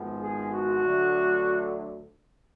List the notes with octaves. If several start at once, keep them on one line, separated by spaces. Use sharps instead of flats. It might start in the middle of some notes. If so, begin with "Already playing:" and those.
Already playing: G#1 G#2 F3 G#3 B3
G#4
F#4
D2 D3 F#3 A3